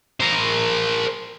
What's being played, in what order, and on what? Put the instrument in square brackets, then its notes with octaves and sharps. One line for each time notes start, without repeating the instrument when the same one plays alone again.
[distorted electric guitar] A#4 C5